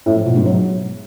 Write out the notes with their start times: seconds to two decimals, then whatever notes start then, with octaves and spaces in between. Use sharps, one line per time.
0.06 A2
0.16 F3
0.26 B2
0.36 G#2
0.46 F#3